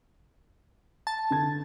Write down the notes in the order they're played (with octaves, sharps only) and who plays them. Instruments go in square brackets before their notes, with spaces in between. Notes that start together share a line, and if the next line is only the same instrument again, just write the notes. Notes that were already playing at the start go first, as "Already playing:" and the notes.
[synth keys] A5
[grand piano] D3 G#6